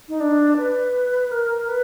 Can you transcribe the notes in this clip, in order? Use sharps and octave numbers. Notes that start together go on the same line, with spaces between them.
D#4
D4
B4
A#4
B4